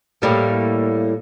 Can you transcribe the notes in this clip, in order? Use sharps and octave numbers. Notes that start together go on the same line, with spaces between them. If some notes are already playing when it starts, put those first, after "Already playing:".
A2 G3 A#3